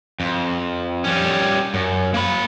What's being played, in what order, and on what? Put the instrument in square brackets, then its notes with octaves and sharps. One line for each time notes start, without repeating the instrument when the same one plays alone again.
[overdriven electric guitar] F2
G3 C#4
F#2
A#3 B5